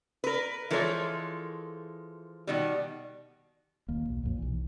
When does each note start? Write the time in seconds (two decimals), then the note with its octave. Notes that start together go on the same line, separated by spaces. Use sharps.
0.24 A#4 B4
0.71 E3 F3 G#3 A4 A#4 C#5
2.47 B2 D#3 G3
3.88 D#1 D#2 A#3
4.09 B1
4.23 A#1 F2 A#2
4.38 B1 E3